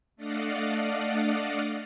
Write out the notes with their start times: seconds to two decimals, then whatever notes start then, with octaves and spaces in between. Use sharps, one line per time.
0.16 A3 D4 D5 D#5 F5 F#5